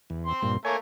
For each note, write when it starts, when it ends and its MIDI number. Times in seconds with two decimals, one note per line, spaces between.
0.10 0.33 40
0.26 0.54 60
0.26 0.54 84
0.43 0.57 43
0.43 0.57 46
0.65 0.76 57
0.65 0.76 58
0.65 0.76 73
0.65 0.76 80